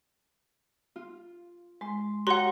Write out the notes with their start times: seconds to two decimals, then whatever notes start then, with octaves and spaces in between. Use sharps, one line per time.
0.96 F4
1.81 G#3 C6
2.27 F#4 G4 C#5 F#5 A#5 C6